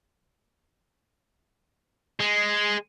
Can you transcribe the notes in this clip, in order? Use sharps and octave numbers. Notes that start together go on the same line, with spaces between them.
G#3